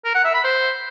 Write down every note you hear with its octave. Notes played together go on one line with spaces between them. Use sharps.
A#4
F#5
E5
B5
C5